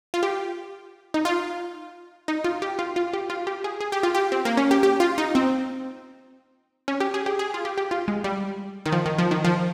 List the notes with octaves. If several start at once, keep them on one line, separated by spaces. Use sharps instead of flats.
F4
G4
D#4
F4
D#4
F4
G4
F4
F4
G4
F4
G4
G#4
G#4
G4
F4
G4
C4
A#3
C#4
G4
G4
F4
D#4
C4
C#4
G4
G#4
G4
G#4
F4
G4
G4
F4
G#3
G3
D#3
F3
D#3
F3
D#3
F3